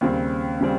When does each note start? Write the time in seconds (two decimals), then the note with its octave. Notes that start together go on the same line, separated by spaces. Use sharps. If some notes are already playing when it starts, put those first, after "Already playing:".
0.01 D#2 C#3 G3 C4
0.61 C#3 G3 C4